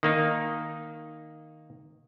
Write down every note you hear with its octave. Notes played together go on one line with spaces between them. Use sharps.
D#3 A#3 D#4